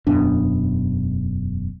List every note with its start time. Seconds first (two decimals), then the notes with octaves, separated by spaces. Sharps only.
0.07 E1 F#2 B2 D4